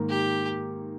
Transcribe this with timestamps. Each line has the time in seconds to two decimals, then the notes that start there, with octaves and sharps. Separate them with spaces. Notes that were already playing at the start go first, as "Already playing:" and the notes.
Already playing: G#2 D#3 A#3
0.09 G4